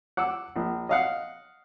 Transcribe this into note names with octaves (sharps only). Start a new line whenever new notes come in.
F#5 D6 E6
A#1
D#5 F5 F#5